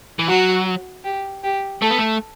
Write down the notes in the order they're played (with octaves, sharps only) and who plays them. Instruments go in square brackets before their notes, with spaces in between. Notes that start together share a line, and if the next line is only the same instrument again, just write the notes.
[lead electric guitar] E3
[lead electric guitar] F#3 [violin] F#4
[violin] G4
G4
[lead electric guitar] A3 [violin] A4
[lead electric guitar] B3
A3